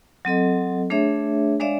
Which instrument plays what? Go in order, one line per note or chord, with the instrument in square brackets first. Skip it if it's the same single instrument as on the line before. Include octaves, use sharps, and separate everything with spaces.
[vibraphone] F#3 C4 A4 D#5
A3 D4 G#4 C#5 E5
G#3 D4 C#5 D5 E5 F5